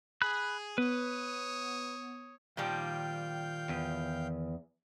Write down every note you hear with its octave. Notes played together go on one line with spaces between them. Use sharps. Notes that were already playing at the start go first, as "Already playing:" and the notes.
G#4 B5 F#6
B3 B4 C#5 D#6
A#2 D#3 F3 G3 F5 G5 A5 G6
E2